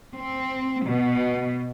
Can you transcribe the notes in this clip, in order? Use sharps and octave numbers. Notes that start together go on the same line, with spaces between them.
C4
B2